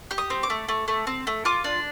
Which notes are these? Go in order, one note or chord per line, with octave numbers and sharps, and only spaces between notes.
G4
D#6
C4
D6
A3
A3
A3
C4
A3
F4 D6
D4